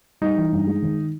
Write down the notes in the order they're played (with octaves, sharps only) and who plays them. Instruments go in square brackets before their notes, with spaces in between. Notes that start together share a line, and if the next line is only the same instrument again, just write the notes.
[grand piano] G3 [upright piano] D#4
[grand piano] E3
G2
G#3
D#3